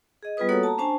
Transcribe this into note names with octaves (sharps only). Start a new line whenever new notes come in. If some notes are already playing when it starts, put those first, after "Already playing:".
G#4 D#5
G3 B3 F4 G#4 B4 D#6
A#3 F#4 A4 C#5 F#5 D#6
A5 A#5
C#4 D4 C5 G#5 A5